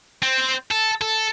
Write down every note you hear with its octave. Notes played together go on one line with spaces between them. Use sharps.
C4
A4
A4